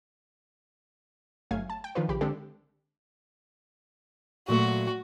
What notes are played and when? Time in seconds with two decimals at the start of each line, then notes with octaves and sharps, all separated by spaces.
1.51 G1 F#3 A3 F5 G#5 G#6
1.70 A5
1.84 G5
1.95 D#3 F3 D4 F4 B4
2.09 A#1 C#3 G4 B5
2.21 D3 G#3 C4 D4 G4 A4
4.49 A#2 F#3 A3 F#4